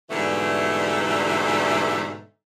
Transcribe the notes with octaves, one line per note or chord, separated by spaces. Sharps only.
G#2 B2 D3 E3 G3 A3